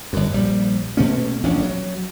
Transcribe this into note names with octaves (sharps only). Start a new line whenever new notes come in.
G1 F#2
A#1 G3
B2 A3 A#3 C#4
E1 A#1 C#4 D4
F#3